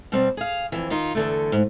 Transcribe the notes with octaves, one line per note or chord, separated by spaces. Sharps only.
B2 G3 C4
G#4 F5
F2 E3
D#3 D#4 F4
E2 D3 A3
G#2